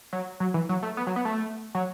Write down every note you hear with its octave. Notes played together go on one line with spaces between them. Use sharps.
F#3
F#3
E3
F#3
A3
B3
F#3
B3
A3
F#3